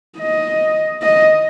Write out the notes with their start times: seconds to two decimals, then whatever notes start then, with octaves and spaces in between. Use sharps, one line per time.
0.18 D#5
1.02 D#5